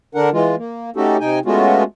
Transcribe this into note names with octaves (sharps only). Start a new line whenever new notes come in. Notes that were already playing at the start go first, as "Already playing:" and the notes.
D3 D4 A#4 F#5
E3 G#3 F4
A#3
A3 C#4 D#4 F#4 G4 A4
C3 D#4 G5 G#5
G#3 A3 B3 C#4 F4 F#4